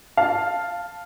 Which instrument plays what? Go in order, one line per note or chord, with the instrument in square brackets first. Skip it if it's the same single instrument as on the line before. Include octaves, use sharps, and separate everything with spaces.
[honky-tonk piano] F5 A5